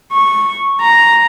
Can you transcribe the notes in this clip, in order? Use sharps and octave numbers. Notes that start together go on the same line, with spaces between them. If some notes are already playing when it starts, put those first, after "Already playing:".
C#6
A#5